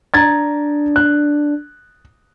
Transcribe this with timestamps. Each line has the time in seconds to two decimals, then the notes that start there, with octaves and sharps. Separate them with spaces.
0.14 D4 A#5 G#6 A6
0.96 F#6